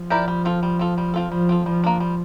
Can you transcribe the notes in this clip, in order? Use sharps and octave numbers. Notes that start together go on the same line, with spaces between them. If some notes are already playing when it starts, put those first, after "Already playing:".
Already playing: F3
E4 G4 A#4 D5
G3
C4 F4 A4
G3
C4 F4 A4
G3
C4 F4 A4
F3 G3
C4 F4 A4
F3 G3
A#3 D4
G3